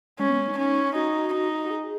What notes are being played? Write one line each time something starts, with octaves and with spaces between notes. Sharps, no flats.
G#3 C#4
B3
G#3
D#4
C#4
D#4 F#4
D#4
F#4
G#4